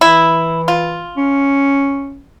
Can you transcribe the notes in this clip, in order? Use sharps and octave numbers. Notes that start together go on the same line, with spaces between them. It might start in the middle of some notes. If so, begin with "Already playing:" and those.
E3 E4
F4
C#4